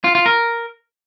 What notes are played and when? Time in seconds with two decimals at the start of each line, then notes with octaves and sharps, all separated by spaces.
0.04 F4
0.15 F4
0.26 A#4